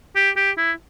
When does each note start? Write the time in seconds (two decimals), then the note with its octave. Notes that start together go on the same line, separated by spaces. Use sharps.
0.16 G4
0.36 G4
0.57 E4